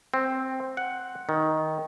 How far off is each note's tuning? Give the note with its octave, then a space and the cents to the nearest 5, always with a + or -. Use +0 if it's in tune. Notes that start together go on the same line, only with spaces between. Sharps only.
C4 +5
F#5 +5
D#3 +10